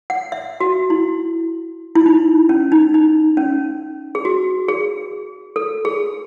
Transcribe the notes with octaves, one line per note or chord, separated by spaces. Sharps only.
F#5
E5
F#4
E4
E4
D#4
C#4
D#4
D#4
C#4
G#4
F#4
G#4
A4
G#4